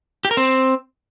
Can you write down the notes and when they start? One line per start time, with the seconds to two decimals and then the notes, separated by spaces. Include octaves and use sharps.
0.25 G4
0.31 A#4
0.37 C4